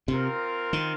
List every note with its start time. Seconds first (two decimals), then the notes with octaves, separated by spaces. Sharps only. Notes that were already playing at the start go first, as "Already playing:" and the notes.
0.08 C3 C4 F4 A#4
0.73 D#3